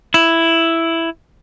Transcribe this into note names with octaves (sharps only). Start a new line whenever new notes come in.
E4